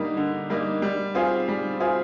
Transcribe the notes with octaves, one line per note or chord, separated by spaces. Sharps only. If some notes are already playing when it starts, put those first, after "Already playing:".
Already playing: D3 G3 A#3 D#4
D3
G3 A#3 D#4
G3
C4 F4 G#4
G3
C4 F4 G#4